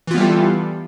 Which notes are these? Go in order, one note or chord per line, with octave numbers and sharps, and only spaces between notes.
E3 G3 B3 F4 A4